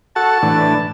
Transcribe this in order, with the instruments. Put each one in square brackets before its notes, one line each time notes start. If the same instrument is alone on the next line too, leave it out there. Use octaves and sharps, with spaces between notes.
[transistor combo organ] F#4 A4 F#5 [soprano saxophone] A5
[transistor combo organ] A2 E3 D4